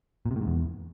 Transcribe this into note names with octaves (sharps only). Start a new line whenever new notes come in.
A#2
C3
A2
G#2
E2